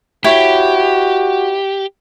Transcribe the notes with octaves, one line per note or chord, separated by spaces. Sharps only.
E4 F#4 G4 C#5